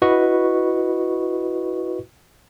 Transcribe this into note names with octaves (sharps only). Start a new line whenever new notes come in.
E4 F#4 B4 D#5 C#6